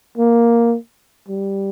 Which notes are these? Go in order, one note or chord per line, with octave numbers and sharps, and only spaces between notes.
A#3
G3